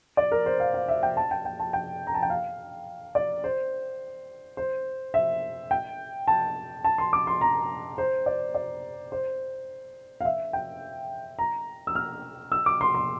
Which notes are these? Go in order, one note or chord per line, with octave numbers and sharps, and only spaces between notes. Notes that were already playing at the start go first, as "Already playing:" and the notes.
D5
A#4
C5
F5
F5
E5
G5
A5
G5
G5
A5
G5
A#5
A5
G5
F5
D5
C5
C5
E5
G5
A5
A5
C6
D6
C6
A#5
C5
D5
D5
C5
F5
E5
G5
A#5
E6
F6
E6
D6
C6
C6